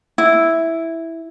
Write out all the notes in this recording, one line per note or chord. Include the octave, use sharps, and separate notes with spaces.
E4